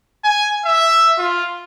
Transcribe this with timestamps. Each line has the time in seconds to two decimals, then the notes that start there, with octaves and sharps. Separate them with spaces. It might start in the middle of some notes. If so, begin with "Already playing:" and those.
0.24 G#5
0.65 E5
1.18 F4